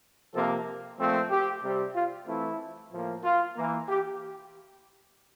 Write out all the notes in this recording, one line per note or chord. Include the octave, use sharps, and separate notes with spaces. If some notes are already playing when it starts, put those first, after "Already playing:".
C3 F3 A#3 A4
A#2 F3 A3 C4
G4
C3 G3 C4
F4
E3 A3 C4 E4
A2 F3 A#3
F4
E3 A#3
G4